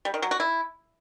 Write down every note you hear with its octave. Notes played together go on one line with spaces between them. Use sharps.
G3
D#3
F#3
F#4
E4